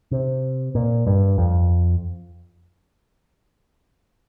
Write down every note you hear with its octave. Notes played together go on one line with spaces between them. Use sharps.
C3
A#2
G2
F2